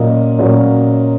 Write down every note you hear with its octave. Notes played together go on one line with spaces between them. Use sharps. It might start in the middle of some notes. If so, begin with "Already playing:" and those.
Already playing: A#2 F#3 A#3 C#4 D#5
A#2 F#3 A#3 C#4